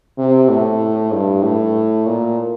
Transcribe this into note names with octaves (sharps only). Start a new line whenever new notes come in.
C3
A2
G2
A2
A#2